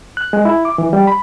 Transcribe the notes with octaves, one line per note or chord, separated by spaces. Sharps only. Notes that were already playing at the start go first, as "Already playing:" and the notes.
F#6
G#3
E4
D6
E3
G3
B5